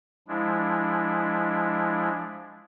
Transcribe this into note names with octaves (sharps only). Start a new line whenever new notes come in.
F3 G#3 D4 E4